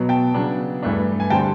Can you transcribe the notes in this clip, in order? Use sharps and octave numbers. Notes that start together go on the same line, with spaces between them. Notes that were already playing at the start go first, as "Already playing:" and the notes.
Already playing: B2 F#3 B3
G5 A5
C#3 F#3 B3 D4
G2 E3 A3 D4
G#5
D3 G3 C4 G5 A5